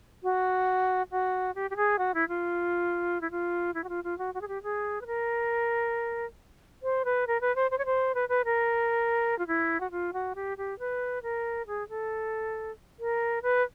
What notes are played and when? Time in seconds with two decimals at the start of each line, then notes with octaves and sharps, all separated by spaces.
0.23 F#4
1.11 F#4
1.55 G4
1.70 G4
1.76 G#4
1.99 F#4
2.14 E4
2.28 F4
3.21 E4
3.31 F4
3.74 E4
3.84 F#4
3.89 F4
4.04 F4
4.18 F#4
4.34 F#4
4.41 G#4
4.48 G4
4.63 G#4
5.01 B4
5.07 A#4
6.83 C5
7.05 B4
7.27 A#4
7.41 B4
7.56 C5
7.71 C5
7.78 C#5
7.85 C5
8.15 B4
8.29 B4
8.45 A#4
9.39 F4
9.47 E4
9.80 F#4
9.91 F4
10.13 F#4
10.35 G4
10.57 G4
10.79 B4
11.23 A#4
11.67 G#4
11.89 A4
12.99 A#4
13.43 B4